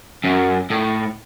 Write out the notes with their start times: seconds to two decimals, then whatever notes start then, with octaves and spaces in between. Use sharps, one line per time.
0.24 F#2
0.71 A2